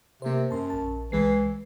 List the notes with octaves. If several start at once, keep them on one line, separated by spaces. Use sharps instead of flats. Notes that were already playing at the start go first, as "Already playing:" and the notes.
C3 A#3 C5
F#2 A5 C6
A#1 A5
C2 E3 G#3 C7